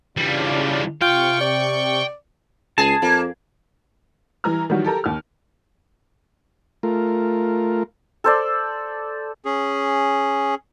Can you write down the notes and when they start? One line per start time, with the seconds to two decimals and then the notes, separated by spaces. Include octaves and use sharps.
0.17 C#3 E3 G3 D4 F4
1.02 C3 F4 G5 C#6
1.41 D5
2.78 C#2 G#4 A5
3.02 F2 A#3
4.44 E3 G3 A#5 F6
4.70 D#3 E3 F#3 G3 F#4
4.84 G4 A4 A#4 A#5
5.04 D#2 F6
6.83 A3 F4 A#4
8.24 A4 C5 D5
9.45 C#4 G#4